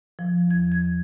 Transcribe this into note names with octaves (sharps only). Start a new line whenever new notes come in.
F3
E2 G#6
G#6